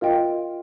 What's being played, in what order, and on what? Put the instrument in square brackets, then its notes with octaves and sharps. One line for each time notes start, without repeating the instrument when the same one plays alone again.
[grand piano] F4 [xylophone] A#4 D#5 G5